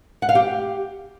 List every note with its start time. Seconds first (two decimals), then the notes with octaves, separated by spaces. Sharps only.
0.22 F#5
0.29 F5
0.35 G4